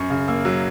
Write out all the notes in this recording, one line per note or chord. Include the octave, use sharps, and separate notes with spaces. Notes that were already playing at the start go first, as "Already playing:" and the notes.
Already playing: F#2 C#6
C#3
A#3 E6
F#3 E6